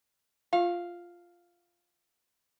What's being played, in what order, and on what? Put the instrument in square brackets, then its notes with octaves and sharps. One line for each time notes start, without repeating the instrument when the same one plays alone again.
[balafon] F4 [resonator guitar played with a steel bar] F5